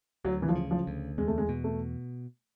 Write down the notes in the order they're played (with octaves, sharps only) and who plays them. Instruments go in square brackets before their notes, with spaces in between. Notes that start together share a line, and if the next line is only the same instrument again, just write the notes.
[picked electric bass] D2 [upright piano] F#3
[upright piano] E3
F3
[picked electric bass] C#3
[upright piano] F3
[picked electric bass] D2
[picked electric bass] E2 [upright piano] G#3
[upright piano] A3
G#3
[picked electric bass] B2
[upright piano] A3